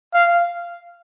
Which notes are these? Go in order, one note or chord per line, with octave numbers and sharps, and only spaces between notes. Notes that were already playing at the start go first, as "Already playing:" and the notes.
F5